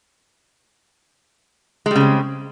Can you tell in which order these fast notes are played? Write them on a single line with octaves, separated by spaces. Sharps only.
G#3 G3 C#3 C4